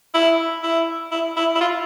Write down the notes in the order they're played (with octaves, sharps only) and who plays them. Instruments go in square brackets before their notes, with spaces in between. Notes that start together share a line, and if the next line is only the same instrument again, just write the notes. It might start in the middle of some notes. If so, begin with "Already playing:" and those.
[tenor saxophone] E4
E4
E4
E4
E4
F4